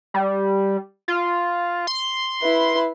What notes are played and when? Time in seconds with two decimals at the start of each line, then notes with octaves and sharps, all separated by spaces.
0.14 G3
1.08 F4
1.87 C6
2.43 E4 B4